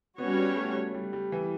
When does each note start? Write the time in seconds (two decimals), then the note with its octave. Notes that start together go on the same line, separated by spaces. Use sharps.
0.18 G3 B3 C#4 F#4 C#5
0.34 B3
0.56 A3
0.94 G3
1.13 G3
1.32 E3